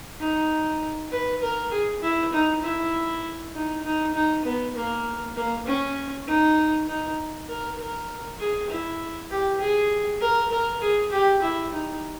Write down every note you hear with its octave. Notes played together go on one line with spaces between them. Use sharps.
D#4
B4
A#4
G#4
E4
D#4
E4
D#4
D#4
D#4
B3
A#3
A#3
C#4
D#4
D#4
A#4
A#4
G#4
E4
G4
G#4
A#4
A#4
G#4
G4
E4
D#4